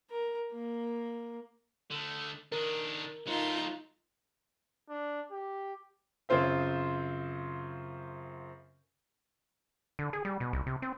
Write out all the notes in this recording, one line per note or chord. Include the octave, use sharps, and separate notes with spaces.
A#4
A#3
D3 A3
D#3 D4 A#4
F#3 A3 D#4 F4
D4
G4
F#2 C#3 C4 F4 C5 E5
D3
G#4
G3
B2
C2
C3
C4